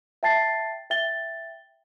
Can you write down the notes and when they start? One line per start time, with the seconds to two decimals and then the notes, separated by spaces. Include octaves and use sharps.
0.23 E5 G5 A5 A6 C7
0.90 E5 G5 A6 G7